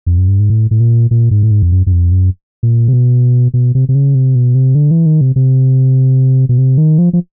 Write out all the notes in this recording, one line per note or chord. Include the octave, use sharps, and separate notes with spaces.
F2
F#2
G2
G#2
A2
A2
A#2
A#2
G#2
A2
G#2
F2
F#2
F#2
F2
F#2
A#2
C3
B2
B2
C3
C3
C#3
C3
B2
C3
D3
E3
D#3
C3
C3
B2
C3
D#3
F3
F3